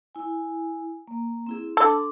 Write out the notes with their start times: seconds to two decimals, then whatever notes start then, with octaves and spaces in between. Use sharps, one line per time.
0.15 E4 G#5
1.08 A#3
1.47 C4 E4 G#4
1.77 D4 A4 C6 D6